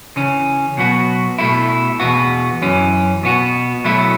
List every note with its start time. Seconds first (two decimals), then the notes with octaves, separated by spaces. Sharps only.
0.16 C#3 E3 C#4
0.77 B2 F#3 B3 F#4
1.38 B2 A3 E4
2.00 E2 B2 B3 F#4
2.61 F#2 E3 C#4
3.23 B2 B3 F#4
3.84 B2 F#3 A3 E4